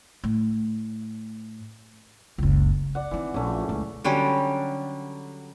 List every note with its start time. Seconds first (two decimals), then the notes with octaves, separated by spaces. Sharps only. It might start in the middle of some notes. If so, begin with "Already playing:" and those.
0.24 A2
2.38 F#1 C#2
2.95 D5 F#5
3.11 D#3 E3 C4
3.34 A#1 A3 C#4
3.69 C#2
4.04 D3 F#3 G3 C#4